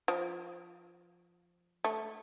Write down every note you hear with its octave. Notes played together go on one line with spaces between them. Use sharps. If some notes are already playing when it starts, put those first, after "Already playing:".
F3
A3